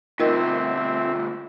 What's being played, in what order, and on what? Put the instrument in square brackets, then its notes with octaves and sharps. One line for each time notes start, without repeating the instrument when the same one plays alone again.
[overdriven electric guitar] D2 B2 [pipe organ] C4 E5 [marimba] D#4 A#4 D#5 [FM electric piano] F4